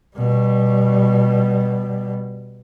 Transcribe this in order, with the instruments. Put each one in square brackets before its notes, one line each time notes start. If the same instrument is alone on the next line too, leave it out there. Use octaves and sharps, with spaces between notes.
[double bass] B2 G3